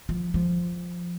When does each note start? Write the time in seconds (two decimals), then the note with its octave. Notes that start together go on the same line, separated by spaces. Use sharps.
0.09 F3
0.34 F3